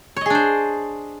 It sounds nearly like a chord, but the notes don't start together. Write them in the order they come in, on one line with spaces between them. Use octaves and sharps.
C#5 D#5 G#4 D4 C5